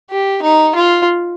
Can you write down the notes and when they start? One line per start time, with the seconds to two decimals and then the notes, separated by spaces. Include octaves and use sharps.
0.11 G4
0.43 D#4
0.76 F4